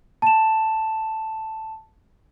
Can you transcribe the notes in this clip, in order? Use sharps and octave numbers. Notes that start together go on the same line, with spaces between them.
A5 E7